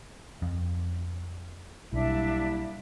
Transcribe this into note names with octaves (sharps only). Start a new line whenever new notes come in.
F2
B1 G3 A#3 D4 E4 E5